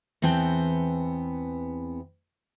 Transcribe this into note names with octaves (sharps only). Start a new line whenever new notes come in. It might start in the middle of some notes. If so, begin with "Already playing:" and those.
E2 E3 B3 C4 G5 A5